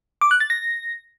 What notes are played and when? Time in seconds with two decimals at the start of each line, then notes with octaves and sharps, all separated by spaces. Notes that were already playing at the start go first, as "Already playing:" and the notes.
0.21 D6
0.31 F#6
0.40 A6
0.50 A#6